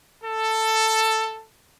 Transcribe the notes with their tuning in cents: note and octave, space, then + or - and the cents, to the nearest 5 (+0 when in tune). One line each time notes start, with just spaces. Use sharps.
A4 +10